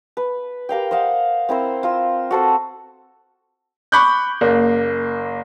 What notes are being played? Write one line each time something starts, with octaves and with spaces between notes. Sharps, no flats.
B4
G4 A#4 F5 G5
C5 D#5 F5 F#5
C4 E4 A#4 C5
F4 A#4 E6
F#4 A4 C5
B5 C#6 D6 F#6 G6
F#1 A#3